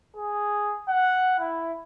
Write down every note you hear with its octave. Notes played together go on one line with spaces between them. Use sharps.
G#4
F#5
E4